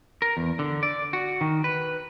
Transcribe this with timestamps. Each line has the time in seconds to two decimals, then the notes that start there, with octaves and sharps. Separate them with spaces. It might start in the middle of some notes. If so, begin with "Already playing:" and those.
0.22 A#4
0.37 E2
0.59 D3
0.83 D5
1.13 F#4
1.41 D#3
1.64 B4